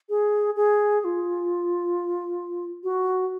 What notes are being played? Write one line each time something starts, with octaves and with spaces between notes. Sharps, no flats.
G#4
G#4
G#4
F4
F#4